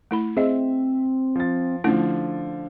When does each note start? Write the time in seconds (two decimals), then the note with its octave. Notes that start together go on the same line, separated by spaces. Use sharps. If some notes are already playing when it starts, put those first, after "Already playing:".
0.11 A3 E4 B5
0.37 C4 G#4 D#5 E5
1.36 F3 A6
1.84 D3 F3 A3 C#4 E4